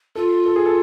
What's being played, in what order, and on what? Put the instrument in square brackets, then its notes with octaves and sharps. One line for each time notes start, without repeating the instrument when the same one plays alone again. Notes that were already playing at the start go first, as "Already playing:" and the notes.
[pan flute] F4 [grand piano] A4
[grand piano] A4
G#4
A4